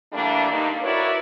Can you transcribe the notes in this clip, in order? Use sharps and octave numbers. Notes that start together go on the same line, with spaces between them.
E3 G3 A3 A#3 D4
G2 D3 A#3 D#4
E4 F#4 A#4 B4 C#5 D5